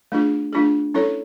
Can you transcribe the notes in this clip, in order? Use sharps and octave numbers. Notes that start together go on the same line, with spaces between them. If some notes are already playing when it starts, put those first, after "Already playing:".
A3 D4 F4 G#4
A3 D4 F4 G#4
C#4 E4 A4 C#5